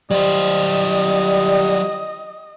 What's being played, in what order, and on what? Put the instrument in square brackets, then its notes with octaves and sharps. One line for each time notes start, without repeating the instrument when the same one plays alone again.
[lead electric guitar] F#3 C5 [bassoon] G3 [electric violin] D#5